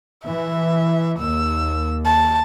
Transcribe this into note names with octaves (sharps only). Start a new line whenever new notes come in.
E3 E5
D#2 E6
A5